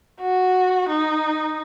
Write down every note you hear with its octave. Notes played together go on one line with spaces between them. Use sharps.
F#4
D#4